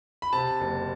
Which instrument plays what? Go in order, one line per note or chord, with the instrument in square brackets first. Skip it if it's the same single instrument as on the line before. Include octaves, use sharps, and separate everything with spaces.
[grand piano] B5
C3 A5
F#1